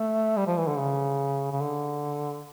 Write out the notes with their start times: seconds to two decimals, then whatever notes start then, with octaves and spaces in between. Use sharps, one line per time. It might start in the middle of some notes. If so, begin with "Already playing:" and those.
Already playing: A3
0.37 G3
0.47 F3
0.57 E3
0.67 D3
0.78 C#3
1.52 C#3
1.61 D3